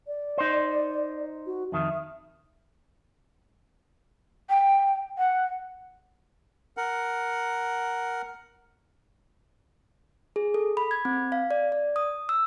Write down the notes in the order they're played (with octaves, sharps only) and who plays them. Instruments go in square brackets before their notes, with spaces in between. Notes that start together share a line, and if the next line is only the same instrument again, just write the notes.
[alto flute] D5
[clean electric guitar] D#4 C5
[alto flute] F#4
[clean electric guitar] F2 D#3 [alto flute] E5
[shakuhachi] G5
F#5
[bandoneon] A#4 F#5
[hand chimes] G#4
A4
B5
G#6
C4
F5
D5
D5
D#6
E6